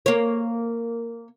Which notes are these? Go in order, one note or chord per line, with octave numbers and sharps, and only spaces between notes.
A#3 C#5